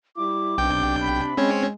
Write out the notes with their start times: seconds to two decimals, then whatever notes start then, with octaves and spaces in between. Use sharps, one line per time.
0.17 G3 E4 D6
0.58 B1 C3 D4 G5 G6
1.01 B5
1.37 G#3 C4 C#4 C#5